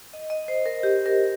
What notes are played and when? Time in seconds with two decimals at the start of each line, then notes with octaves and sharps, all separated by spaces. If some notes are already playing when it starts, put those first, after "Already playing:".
0.13 D#5
0.30 D#5
0.48 C5
0.66 A#4
0.83 G4
1.06 A#4